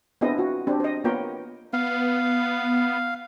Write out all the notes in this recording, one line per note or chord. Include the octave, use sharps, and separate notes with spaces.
B3 C4 D4 E4 G#4 D#5
F4 F#4
C4 D4 G4
C5 D#5
A#3 B3 F4 A#4 C#5 G5
B3 F5